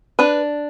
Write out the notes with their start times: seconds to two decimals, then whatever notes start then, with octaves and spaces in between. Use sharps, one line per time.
0.19 D4 B4